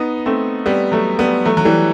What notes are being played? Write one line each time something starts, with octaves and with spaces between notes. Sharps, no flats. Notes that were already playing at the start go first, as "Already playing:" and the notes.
Already playing: B3 D#4
A3 C4
G3 B3
F#3 A3
G3 B3
F#3 A3
F#3
E3 G3